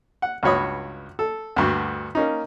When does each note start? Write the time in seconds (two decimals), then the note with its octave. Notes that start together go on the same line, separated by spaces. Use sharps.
0.22 F#5
0.43 C#2 G2 F#4 C#5 B5 D#6
1.19 A4
1.56 D2 G2 F#4
2.15 A#3 C#4 D#4